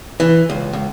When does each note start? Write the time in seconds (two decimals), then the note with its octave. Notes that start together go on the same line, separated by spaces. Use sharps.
0.20 E3
0.50 C#2
0.73 C#2